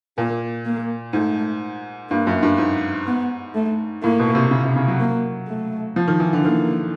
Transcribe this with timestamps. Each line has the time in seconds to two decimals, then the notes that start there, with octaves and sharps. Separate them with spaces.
0.18 A#2 A#3
0.65 A#3
1.13 G#2 A3
2.10 G2 A#3
2.27 F#2
2.43 G2
2.58 G#2
3.06 B3
3.55 A3
4.03 A2 A#3
4.19 B2
4.35 C3
4.51 C#3
4.63 C3
4.76 C#3
4.88 F#3
4.99 A#3
5.48 A3
5.96 F3
6.08 D#3
6.20 E3
6.33 D3
6.45 D#3 A#3